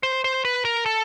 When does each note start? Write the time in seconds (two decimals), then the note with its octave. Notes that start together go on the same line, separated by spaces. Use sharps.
0.03 C5
0.24 C5
0.45 B4
0.65 A#4
0.86 A4